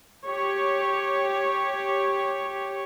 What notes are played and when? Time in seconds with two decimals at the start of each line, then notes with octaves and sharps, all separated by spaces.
0.27 G4 C#5